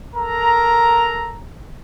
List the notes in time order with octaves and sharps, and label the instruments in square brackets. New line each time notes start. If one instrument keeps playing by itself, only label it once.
[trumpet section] A4 A#4 A#5